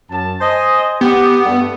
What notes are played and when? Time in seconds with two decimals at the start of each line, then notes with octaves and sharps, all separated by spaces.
0.11 F#2 A5
0.41 C5 D#5 G#5
1.01 B3 G4
1.45 G2 A3